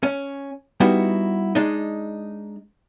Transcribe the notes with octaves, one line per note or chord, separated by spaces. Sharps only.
C#4
G3 B3 D#4 E4 F#4
G#3 D4 D#4